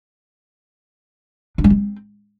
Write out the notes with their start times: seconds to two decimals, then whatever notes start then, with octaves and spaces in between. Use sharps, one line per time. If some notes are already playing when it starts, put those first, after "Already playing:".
1.58 D4
1.64 G#3
1.70 C4